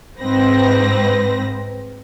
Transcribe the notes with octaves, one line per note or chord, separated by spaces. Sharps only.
G#2 C4 B4 A#6